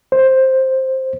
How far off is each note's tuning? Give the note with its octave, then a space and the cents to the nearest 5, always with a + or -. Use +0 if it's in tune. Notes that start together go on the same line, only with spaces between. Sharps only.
C5 +10